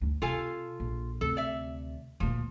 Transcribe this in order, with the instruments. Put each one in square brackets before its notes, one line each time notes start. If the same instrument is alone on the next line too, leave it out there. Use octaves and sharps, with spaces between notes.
[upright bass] D2 D#4
[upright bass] C3 [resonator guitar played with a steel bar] F4 A4 G#5
[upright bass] A#1
[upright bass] D2 C3 [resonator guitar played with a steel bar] A4
[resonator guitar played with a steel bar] D5 E5
[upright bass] D2 A#2 [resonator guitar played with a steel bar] F3